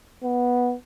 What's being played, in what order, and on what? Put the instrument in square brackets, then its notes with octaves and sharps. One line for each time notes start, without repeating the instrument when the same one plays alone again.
[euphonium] B3